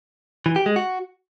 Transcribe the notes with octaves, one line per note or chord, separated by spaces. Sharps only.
E3
G4
G#3
F#4